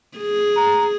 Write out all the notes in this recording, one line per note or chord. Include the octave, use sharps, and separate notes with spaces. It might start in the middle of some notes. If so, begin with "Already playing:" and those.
G#4
A#5